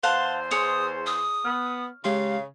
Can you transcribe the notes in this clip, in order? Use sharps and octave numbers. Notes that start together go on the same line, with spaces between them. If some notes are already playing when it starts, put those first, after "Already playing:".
E2 C5 F5 F#5 A5 C6
G#4 C#5 G#5 C6 D#6
D#6
B3 F6
C#3 G#3 G4 F5 C6